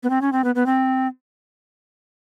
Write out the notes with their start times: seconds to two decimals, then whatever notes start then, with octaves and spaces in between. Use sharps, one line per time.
0.03 B3
0.10 C4
0.22 C#4
0.33 C4
0.44 B3
0.55 B3
0.66 C4